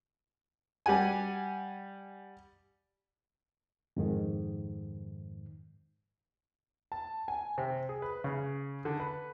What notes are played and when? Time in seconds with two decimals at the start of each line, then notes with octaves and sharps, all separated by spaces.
0.86 G3 G4 F#5 G#5
3.97 F2 G#2 D#3
6.92 A5
7.28 G#5
7.58 C3
7.89 G#4
8.02 B4
8.24 C#3
8.85 D3
9.00 B4